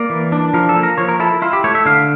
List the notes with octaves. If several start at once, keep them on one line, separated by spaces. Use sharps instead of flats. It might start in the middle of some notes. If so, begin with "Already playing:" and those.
Already playing: A#3 D5
E3
D4
F3 A#4
A4
A#3
A#4
F3 C#5
A#4
E4 A4
E4 F4
G4
A3 C#5
E5
D3 F5